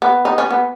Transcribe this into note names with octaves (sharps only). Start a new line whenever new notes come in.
B3
D#4
C#4
B3